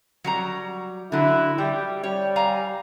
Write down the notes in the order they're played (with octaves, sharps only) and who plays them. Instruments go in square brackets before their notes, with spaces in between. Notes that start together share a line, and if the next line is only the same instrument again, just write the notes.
[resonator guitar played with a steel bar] F#3 G3 A#5
[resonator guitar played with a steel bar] D3 F#3 [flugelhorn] E4
[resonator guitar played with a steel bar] G3 [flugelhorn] G4
[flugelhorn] G3 [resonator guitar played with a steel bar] C#5
[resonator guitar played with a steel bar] F5 G#5 A#5